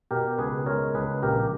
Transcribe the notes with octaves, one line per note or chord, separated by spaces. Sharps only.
B2 G4 A#4
C#2 G#4 B4
G#3 A#4 C#5
C#2 G#4 B4
A#1 G4 A#4